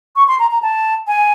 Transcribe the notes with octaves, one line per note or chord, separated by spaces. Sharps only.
C#6
C6
A#5
A#5
A5
G#5